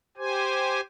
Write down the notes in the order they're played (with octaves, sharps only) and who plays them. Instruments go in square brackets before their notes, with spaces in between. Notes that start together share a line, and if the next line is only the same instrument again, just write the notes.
[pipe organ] G4 C5 G#5